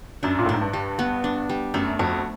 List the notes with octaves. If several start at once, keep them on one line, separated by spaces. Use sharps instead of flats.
F#2 D4
A#2
A2
G#2 D4
G2
G3
B3
D4
G3
F#2 A3
F2 F#4